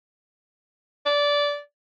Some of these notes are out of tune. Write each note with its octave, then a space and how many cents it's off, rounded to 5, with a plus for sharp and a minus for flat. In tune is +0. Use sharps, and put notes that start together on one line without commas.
D5 -15